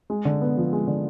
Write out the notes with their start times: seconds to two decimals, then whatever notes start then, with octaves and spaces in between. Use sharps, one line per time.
0.10 G#3
0.25 D3
0.41 B3
0.57 F3
0.73 G#3
0.88 D3